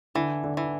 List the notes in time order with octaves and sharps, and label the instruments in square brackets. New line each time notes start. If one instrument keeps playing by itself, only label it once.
[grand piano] D3 [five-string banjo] E3
[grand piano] D3
[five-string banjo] E3